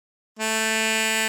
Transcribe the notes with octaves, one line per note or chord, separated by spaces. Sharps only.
A3